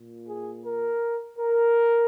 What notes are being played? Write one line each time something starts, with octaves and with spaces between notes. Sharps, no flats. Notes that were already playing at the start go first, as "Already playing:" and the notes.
Already playing: A#2
G#4
A#4
A#4